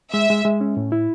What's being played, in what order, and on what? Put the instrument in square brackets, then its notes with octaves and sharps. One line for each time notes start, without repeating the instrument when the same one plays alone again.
[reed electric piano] G#3 [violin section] E5
[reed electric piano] G#3
G#3
C#4
A2
E4